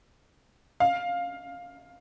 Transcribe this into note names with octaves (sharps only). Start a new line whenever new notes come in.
F5